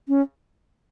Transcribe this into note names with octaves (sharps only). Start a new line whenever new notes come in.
C#4